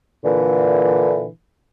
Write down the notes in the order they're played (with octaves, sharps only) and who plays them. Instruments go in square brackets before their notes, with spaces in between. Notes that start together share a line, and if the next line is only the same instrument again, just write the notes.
[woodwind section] A#2 D3 E3